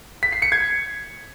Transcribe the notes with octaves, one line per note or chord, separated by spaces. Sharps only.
B6
C7
C#7
G#6